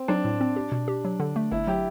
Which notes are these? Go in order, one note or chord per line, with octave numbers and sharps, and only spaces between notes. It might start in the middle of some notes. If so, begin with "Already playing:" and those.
Already playing: C4
F#3 D4
A2
C4
G4
B2
G4
F#3
D3
A3
G1 E4
F#3 G4